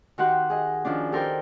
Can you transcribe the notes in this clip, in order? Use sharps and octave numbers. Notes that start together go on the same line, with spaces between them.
D#3 F#4 G4 F#5 C6 F#6
G#4 D#5
D#3 F3 C#4 D4
G4 A4 A#4 C5 G5